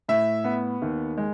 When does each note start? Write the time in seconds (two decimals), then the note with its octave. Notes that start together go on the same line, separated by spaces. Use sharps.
0.08 A2 E5
0.44 B3
0.82 D#2
1.17 G#3